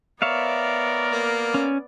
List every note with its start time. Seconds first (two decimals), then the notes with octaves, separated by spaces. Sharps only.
0.22 B3 A#4 C#5 D5 E5 F5
1.12 A#3
1.54 C#4